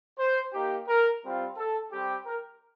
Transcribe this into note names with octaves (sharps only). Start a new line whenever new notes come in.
C5
A#3 D#4 G4
A#4
G3 C4 F4
A4
G3 C4 G4
A#4